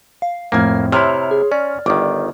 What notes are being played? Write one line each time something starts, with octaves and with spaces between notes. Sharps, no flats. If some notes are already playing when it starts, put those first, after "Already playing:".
F5
F2 A2 A#3 F6 G#6
C3 E4 C#5 A#5 C6 F6
G#4
C#4 D5
G1 D#3 D6